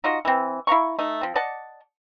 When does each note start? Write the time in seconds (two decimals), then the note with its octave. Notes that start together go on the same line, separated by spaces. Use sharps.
0.04 D#4 F4 F#4 D#5
0.25 E3 C4
0.67 E4 F5 A#5 C#6
0.99 A3 D#4
1.21 F3 C4
1.36 D5 D#5 F#5 A5